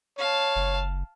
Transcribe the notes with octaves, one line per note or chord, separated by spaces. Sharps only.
C#5 F5 A5
F#1